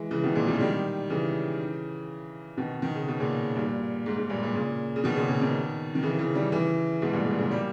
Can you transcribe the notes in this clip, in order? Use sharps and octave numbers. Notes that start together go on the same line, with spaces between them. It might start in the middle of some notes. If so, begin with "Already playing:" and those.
Already playing: E3 G#3
C#3 E3
B2 D#3
A#2 C#3
B2 D#3
G#3
D#3 G3
C#3 E3
B2 D#3
D#3
C#3
B2
A#2 C#3
G2 A#2
G#2
G#2
G2 A#2
G2 A#2
A#2 C#3
C#3
B2 D#3
A#2 C#3
A#2 C#3
B2 D#3
D#3
C#3 E3
C#3 E3
D#3 G3
C#3 E3
G#2 B2
G2 A#2
G#2
A#2 C#3
G3 A#3